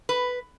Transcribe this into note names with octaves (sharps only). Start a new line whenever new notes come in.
B4